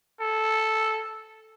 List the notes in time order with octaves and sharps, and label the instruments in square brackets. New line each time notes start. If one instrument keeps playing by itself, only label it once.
[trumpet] A4